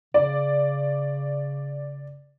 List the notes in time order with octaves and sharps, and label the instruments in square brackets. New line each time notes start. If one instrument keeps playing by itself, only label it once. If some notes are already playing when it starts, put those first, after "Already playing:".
[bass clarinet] C#3 [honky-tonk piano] D5